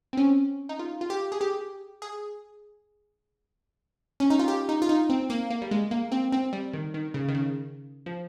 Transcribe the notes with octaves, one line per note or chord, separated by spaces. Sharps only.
C4
C#4
D#4
F4
F4
G4
G#4
G4
G#4
C#4
D#4
F4
G4
D#4
F4
D#4
C4
A#3
A#3
G3
G#3
A#3
C4
C4
G3
D#3
D#3
C#3
D#3
C#3
F3